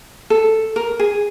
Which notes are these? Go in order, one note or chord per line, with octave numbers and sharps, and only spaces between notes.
A4
A#4
G#4